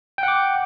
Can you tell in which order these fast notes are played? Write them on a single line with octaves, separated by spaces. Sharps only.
G5 F#5 D6